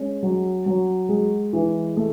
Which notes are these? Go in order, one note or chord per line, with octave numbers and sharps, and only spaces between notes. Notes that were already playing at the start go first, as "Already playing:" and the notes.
Already playing: G#3 C#4
F#3
F#3
G#3
E3
A3